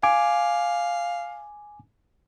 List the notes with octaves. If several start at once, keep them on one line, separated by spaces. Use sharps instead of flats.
F5 G#5 D6